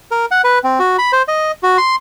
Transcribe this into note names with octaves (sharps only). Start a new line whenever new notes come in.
A#4
F#5
B4
C4
F#4
B5
C5
D#5
F#4
C6